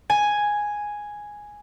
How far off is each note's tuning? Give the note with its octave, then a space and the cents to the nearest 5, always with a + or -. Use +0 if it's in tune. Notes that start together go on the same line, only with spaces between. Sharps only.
G#5 +0